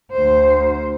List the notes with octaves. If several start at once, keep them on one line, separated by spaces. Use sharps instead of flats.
D2 C5